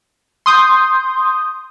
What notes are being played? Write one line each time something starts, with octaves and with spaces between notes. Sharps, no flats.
C6 D#6 G6